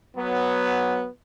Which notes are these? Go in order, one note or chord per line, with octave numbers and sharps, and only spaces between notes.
F#3 B3